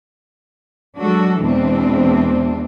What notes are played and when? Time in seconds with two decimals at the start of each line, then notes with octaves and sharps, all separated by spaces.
0.98 F#3 G#3 D4 F#4 A4
1.40 E2 B2 E3 G#3 C4 D4